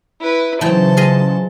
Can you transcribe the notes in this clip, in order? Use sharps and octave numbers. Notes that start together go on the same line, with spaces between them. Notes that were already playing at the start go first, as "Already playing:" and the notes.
E4 B4
C#3 E3 F#3 C5 G5 A5
F4 G#4 D#5